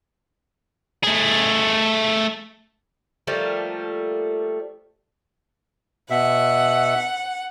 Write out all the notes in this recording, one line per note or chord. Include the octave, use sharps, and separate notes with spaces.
A3 G#4
F3 G3 A3 A#3
B2 E5 F#5